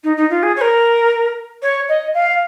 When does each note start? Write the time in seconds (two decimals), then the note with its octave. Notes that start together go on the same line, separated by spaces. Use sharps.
0.03 D#4
0.16 D#4
0.30 F4
0.42 G#4
0.56 C#5
0.61 A#4
1.62 C#5
1.88 D#5
2.13 F5